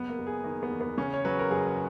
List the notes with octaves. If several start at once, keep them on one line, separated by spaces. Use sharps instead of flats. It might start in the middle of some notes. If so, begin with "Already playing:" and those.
Already playing: F#1 B3
A#3
F#1
G#4
D#3 A#3
B3
E2
B3
C#3 C#4
C#5
F#3 B4
A#4
F#1 G#4